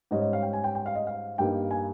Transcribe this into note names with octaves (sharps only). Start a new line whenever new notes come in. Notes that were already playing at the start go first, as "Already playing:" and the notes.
G#2 G3 C#4 D#5
D#5
F5
G5
G#5
G5
G5
F5
D#5
F5
G2 G3 A#3 D#4 G5
G#5